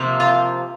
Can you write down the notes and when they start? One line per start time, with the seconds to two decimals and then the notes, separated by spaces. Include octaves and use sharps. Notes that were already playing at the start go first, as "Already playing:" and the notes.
Already playing: C3 F3 A#3
0.20 F4